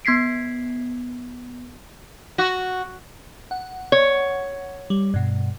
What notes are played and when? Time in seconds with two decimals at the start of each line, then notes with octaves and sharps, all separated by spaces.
0.05 B3 G#6 B6 C7 D7
2.38 F#4
3.51 F#5
3.92 C#5
4.90 G3
5.14 G2 B2